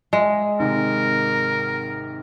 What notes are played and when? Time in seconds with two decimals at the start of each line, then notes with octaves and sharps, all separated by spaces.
0.13 G#3 D#5 E5
0.60 G#1 G#2 C3 A#4